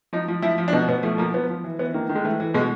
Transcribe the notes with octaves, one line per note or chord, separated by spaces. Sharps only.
F3 D#4
F3
F3 E4
F3
D4
B2 D#4
B2 B3
F3 A3
F3 A#3
F3 B3
F3
E3
E3 B3
D#3 A#3
D#3
G#3
E3 A3
E3
B2 G#3